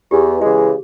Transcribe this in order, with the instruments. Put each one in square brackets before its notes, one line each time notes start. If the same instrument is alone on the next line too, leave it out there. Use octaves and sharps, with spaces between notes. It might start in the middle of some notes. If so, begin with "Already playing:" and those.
[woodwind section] E2 [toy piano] G4
[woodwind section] C#3 E3 G#3 [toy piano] G#4